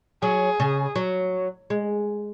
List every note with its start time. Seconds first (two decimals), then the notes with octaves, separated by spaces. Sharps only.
0.22 F#3 G#4
0.60 C#3
0.96 F#3
1.70 G#3